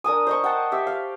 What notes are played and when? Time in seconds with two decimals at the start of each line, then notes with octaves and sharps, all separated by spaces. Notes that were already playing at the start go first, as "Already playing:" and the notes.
0.04 D4 A#4 G#5 D#6
0.27 C5 D#5 C#6
0.44 F#5 G5 A5
0.72 G4 E5
0.87 F5